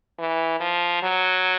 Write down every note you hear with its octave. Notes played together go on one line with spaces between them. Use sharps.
E3
F3
F#3